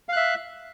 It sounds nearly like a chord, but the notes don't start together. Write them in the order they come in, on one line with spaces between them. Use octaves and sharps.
F5 F#6 E5